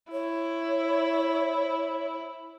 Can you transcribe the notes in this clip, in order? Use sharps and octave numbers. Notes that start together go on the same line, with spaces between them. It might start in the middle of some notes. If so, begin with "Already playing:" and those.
E4 C#5